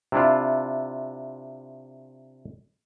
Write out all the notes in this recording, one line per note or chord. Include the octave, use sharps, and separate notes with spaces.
C3 D4 E4 F4